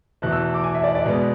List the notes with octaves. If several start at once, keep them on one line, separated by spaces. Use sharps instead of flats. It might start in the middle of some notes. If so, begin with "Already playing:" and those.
E2 B2 A3 F#6
E6
D6
G#5
E5
D5
D5
B2 G#3 B3